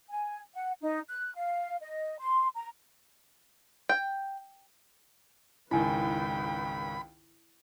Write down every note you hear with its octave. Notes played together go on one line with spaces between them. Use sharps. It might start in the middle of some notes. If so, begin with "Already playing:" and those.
G#5
F#5
D#4
F#6
F5
D#5
C6
A#5
G5
G#1 C#2 D#3 E4 B4 G5 G#5 B5